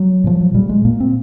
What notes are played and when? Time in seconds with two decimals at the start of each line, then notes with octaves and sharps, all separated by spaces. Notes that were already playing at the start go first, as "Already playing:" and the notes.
Already playing: F#3
0.24 A#2 F3
0.41 F#3
0.54 A#2 G3
0.69 G#3
0.85 A#2 A#3
1.00 C4